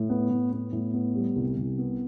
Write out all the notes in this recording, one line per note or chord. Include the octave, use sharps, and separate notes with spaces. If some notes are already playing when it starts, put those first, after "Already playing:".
Already playing: A2
B3
A2
B3
A2
B3
G3
C2
C2
B3